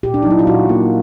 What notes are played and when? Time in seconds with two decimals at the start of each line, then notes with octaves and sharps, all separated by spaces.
0.03 A#2 G4
0.14 D4
0.23 D#4
0.26 F#3 E4
0.39 F4
0.47 A#2 F#4
0.69 A#3